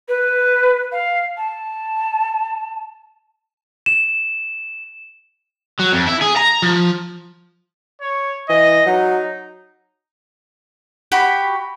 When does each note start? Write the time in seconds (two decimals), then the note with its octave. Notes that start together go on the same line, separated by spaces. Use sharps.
0.08 B4
0.92 F5
1.37 A5
3.86 E7
5.80 F#3
5.93 F2
6.07 E4
6.22 G#4
6.37 A#5
6.62 F3
8.01 C#5
8.49 E3 D#5
8.86 F#3 D#4
11.12 F#4 G4 B5